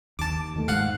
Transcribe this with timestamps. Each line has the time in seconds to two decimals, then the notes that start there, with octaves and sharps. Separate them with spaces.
0.19 D#2 A5 D6
0.56 D#3 A3
0.68 G#2 F5 F#5 F#6